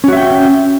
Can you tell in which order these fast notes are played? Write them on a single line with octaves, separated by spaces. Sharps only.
C#4 F#4 E5 G5